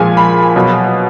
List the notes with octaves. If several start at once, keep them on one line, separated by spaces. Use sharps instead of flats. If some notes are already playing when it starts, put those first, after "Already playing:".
Already playing: A#2 F3 G#3 G#5
B5
B2 F#3